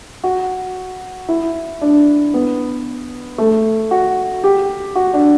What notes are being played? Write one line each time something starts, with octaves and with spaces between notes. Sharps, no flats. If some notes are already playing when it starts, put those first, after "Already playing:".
F#4
E4
D4
B3
A3
F#4
G4
F#4
D4